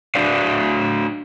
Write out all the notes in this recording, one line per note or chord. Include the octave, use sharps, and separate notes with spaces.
D4 F#4 D5 F5